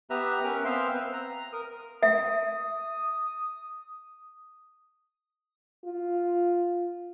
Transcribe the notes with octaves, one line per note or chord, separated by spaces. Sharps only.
B3 G4 B4 E5 A#5
C#4 A#4 B4
B3 C4 C5 E5 F5 C6
B4
A#5
A#4 D#6
E5 D#6
F4